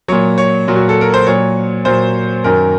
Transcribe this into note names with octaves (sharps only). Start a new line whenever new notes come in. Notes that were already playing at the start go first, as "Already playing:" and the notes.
A#2 F#3 C#5
C#5
A#2 F#3
F#4
A4
A#4
C5
A#2 F#3 C#5
A#2 F#3 C5
F#2 D#3 F#3 A#4